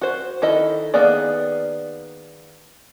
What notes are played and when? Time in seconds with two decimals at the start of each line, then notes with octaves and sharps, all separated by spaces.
0.01 F#4 C5
0.42 D#3 E4 A4 D#5
0.94 D#3 A#3 B3 G#4 D5